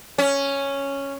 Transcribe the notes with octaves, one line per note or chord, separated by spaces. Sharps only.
C#4